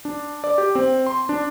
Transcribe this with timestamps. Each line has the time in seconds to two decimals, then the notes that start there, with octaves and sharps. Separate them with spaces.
0.05 D4
0.44 D5
0.58 G4
0.75 C4
1.07 C6
1.29 D4